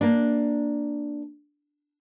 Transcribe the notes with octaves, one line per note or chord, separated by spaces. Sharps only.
A#3 D4